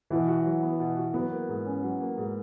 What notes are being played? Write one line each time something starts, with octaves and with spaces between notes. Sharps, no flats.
B2 E3
F#4
F#3
B3
B2
F#4
F#3 B3
A#3
G#2
C#4
F#3
A#3
G#2